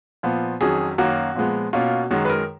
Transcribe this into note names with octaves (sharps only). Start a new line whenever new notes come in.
A#2 F3 B3
F2 D#3 F#3 C#4 G#4
F#2 D#3 A#3 C#4 F#4
A#2 F3 G#3 B3
B2 A#3 C#4 F4
F#2 D#3 G#3 F#4
B4
A#4